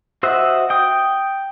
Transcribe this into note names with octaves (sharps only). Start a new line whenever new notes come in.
F#4 C5 D#5 E5 F#5
G5 D#6